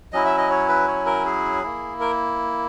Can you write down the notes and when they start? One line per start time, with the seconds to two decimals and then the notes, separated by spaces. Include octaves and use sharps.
0.13 F#3 C#4 E4 D#5
0.25 E5
0.38 D#5
0.50 C#5
0.69 B4
0.88 C#5
1.06 A#4
1.26 G#4
1.63 A#3 E4
2.00 A#4